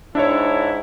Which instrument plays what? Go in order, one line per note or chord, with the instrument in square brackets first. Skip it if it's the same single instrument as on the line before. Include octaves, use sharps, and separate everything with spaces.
[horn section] G#2 E4 [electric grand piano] D4 C#5